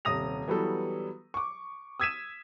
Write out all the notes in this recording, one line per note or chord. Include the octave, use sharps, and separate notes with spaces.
D#1 C3 D#6 A#6 F7
E3 F#3 G3 B3 A4
C#6 D6
D#6 E6 G#6 B6 D#7 E7